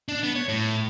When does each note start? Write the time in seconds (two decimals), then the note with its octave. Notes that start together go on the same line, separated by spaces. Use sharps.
0.08 D4
0.23 B3
0.35 C#5
0.48 A2